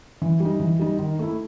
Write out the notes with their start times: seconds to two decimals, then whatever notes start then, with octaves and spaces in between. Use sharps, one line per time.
0.22 E3
0.40 G3
0.45 D#4
0.60 E3
0.79 G3 D#4
0.99 D#3
1.19 A3 E4